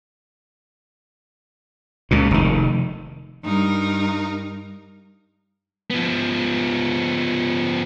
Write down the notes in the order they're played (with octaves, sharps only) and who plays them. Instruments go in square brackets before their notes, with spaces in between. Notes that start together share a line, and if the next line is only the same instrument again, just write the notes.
[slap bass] C#2 A#2
F1 D#3
[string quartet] G2 D#4 A#4
[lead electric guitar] F3 B3